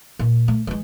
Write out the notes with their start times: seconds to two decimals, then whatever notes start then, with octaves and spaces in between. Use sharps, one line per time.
0.19 A#2
0.48 A3
0.67 E3 G#3